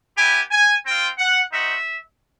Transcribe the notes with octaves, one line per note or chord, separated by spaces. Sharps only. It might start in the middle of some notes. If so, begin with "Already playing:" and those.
B3 E4 G4 G#5
G#5
C4 F4 G5
F#5
C4 D#4 F#4 E5